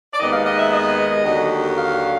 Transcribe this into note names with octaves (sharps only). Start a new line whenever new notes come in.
D5
D#2 D#3 G#3 B3 D#5
F5
D#5
E5
D#5
D#2 D3 F#3
F5